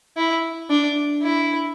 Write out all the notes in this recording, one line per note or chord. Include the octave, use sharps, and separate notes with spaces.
E4
D4
E4